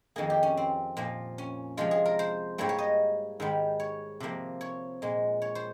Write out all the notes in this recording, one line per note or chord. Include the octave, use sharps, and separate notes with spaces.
F2 D#3 A#3 G#4
G4
C#4
C4
A#2 F3 A#3
C#4
C3 F3 G#3 F4
G#4
A#4
C5
G#2 G3 A#3 C#5
C#5
D#5
G#2 D#3 G3
C#5
C3 F3 A#3
C#5
A#2 G#3
C#5
C5